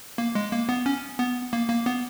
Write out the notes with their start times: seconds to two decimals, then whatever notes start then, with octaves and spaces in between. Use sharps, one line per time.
0.18 A#3
0.35 G#3
0.52 A#3
0.69 B3
0.86 C#4
1.19 B3
1.53 A#3
1.69 A#3
1.86 B3